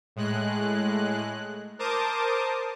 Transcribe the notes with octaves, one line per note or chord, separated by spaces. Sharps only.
A2 G#3 F#6
A#4 C5 A5 D6 D#6